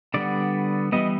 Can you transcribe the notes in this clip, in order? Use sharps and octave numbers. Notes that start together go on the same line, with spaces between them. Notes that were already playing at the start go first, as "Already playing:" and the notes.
D3 G3 B3 D5
E3 G3 B3 D#5